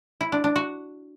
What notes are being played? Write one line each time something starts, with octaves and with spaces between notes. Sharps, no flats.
E4
D4
D4
F#4